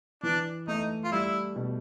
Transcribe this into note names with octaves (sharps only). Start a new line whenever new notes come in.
E3 D4
A3 D#4
F4
G3 E4
B2